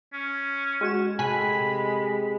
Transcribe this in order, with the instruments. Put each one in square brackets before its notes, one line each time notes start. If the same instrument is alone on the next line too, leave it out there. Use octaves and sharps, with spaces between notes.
[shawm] C#4
[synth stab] G#3 F#4 E7
[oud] C3 A4 [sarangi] G#3 [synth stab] G#5 F#6 B6 [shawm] B5